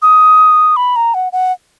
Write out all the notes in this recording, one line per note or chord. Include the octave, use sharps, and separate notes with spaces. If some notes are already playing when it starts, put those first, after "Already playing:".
D#6
B5
A#5
F#5
F#5